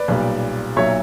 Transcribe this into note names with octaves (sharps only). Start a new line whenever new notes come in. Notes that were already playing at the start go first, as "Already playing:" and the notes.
Already playing: B4 D5
B1 A#2 G3
B1 A#2 F#3 C#5 E5